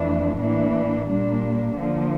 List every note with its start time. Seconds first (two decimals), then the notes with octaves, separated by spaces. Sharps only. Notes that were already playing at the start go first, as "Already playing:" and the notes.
Already playing: F2 E3 A3 D4
0.39 A2 E3 A#3 D4
1.08 A#2 G3 A#3 D4
1.77 D3 F3 A#3